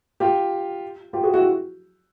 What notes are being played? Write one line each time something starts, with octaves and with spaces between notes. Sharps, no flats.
F4 G4
F4 G4
F#4 G#4
E4 F#4